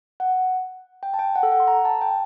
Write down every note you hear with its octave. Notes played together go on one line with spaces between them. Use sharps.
F#5
G5
A5
G5
F#5
A4
F#5
C6
A#5
A5
G5